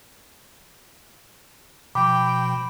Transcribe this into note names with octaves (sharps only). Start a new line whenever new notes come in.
B2 F3 G5 B5 D6